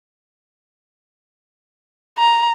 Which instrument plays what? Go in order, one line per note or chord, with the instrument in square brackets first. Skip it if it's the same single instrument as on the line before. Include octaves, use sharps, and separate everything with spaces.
[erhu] A#5